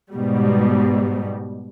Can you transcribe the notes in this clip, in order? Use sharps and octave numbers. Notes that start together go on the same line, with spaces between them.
G#2 B2 G3